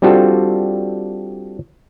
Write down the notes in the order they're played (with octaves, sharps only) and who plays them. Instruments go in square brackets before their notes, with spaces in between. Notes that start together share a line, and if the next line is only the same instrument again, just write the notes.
[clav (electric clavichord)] G3 C4 D4 F4 F#4 A4